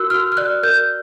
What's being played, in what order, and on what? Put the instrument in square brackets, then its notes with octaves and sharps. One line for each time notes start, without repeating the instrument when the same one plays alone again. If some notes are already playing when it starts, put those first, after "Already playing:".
Already playing: [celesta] F#4 A#4 E6 F#6
F#4 F6
F6
D5 F#6
A#4 G6